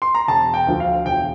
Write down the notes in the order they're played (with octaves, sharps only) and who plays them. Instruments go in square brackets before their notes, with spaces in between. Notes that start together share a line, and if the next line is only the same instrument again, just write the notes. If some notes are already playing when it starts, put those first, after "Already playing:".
[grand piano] C6
A#5
E1 A5
G5
D2 D3 F3
F5
E1 G5